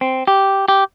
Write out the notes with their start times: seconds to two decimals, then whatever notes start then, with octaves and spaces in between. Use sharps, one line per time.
0.01 C4
0.28 G4
0.68 G4